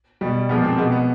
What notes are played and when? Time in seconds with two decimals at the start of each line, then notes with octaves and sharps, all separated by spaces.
0.21 B2 G3
0.49 A#2 F3 G#3 B3
0.64 C4
0.77 B2 G#3 B3
0.92 B3